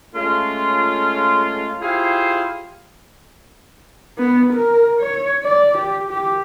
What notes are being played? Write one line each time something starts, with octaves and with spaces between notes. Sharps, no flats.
G#3 A3 C#4 F4
E4 F4 G4 G#4 C5 F5
B3
A#4
C#5
D5
G4
G4